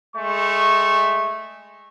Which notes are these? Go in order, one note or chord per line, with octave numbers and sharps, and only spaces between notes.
G#3 A3 C#6